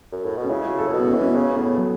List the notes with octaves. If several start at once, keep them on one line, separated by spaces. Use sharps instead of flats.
F#2
A2
B2
C#4
C#3 E4
F#4
A4
A2
B2 F#4
B3
C#4
E3 B3
C#4
B3
C#3 C#4
A2 B3
F#3